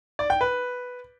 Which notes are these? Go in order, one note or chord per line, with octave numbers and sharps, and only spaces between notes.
D5
G5
B4